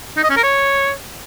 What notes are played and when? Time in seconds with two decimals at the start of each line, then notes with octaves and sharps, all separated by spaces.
0.17 D#4
0.23 D#5
0.30 C#4
0.37 A#4
0.43 C#5